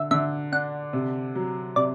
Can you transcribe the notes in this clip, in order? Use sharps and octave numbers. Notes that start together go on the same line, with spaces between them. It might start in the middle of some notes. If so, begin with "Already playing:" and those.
Already playing: D3 E5
D3 E5
D4 F#5
C3
F#3
C3 D5